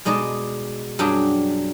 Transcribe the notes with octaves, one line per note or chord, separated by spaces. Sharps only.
B2 G#3 D#4 D5 D#5 A5
F#2 F#3 G3 D4 G#4 G5